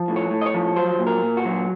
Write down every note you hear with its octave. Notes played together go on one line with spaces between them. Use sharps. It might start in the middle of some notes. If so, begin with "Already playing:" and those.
Already playing: F3
A2
C#5
A2
D#5
C#5
F3
F#3 C5
A#2
A#4
A#2
F#4
F#3